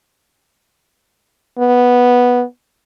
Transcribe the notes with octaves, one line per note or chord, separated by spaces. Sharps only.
B3